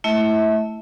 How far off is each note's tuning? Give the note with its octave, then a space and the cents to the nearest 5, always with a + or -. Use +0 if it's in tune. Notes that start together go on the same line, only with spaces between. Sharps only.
A3 +0 E4 +0 E5 -30